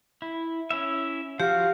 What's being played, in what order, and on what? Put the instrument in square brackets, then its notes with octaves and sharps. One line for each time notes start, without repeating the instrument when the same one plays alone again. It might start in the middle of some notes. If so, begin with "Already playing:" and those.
[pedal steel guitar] E4
C#4 E4 E5
[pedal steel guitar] F3 F#4 [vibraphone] G4 [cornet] F5